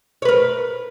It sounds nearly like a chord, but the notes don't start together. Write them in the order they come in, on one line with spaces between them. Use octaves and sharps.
C#5 B4 A#4